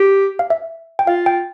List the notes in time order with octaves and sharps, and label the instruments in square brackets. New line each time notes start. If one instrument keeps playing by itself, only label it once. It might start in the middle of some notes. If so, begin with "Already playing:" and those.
Already playing: [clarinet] G4
[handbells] F5
E5
G5
[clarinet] F4 [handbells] F5
[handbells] G5